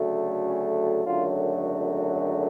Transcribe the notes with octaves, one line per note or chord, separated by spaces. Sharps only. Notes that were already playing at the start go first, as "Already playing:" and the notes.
Already playing: D2 C#3 F#3 A3
C#4
G#1 F#2 D3 F#3 A3 F4